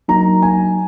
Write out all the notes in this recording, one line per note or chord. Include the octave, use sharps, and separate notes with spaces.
F#3 A#3 D#4 A#5
G#5